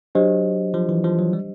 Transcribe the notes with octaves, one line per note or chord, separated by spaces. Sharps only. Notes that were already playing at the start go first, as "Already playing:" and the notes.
F#3 D4 G4 C5 D#5
F3
E3
F3
F#3
G3